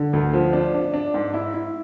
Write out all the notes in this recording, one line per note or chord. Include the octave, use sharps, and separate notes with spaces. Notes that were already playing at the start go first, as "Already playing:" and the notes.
Already playing: D3
D2
F3
D4
D4
D4
G#2
E4
E4